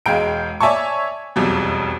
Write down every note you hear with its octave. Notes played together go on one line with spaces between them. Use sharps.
E1 G#3 F5 G5 D7
C#5 D5 E5 G#5 A5 C#6
E1 B1 F2 G3